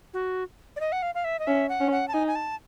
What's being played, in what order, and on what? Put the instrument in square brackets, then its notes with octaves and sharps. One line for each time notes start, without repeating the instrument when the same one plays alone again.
[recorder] F#4
D5
D#5
F#5
F5
F5
E5
D#5
[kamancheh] C#4 [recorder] E5
[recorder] F#5
[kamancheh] C#4
[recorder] F#5
A5
[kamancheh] D#4 [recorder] G#5
[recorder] G#5
A5